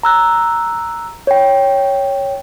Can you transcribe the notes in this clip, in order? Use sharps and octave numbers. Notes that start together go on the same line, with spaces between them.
A#5 E6 F#6
C#5 G5